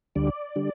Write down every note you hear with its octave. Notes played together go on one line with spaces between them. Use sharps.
D2 D3 G3 D5
D3 G3